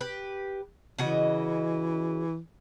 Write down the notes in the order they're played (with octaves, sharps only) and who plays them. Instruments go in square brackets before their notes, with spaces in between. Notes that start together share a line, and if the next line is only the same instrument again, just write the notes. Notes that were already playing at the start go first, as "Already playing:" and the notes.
[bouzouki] G4 B4
[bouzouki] C#3 F#4 D#5 [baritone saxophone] E3